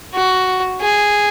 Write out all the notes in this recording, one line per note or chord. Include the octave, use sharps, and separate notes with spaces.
F#4
G#4